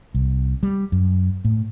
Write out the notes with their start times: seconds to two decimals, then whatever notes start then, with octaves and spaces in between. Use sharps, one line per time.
0.15 C2
0.63 G3
0.92 F#2
1.45 A2